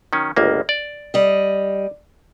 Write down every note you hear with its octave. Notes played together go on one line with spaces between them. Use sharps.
D#3 F#3 C#4
G1 C#2 A#3
D5
G3 D#5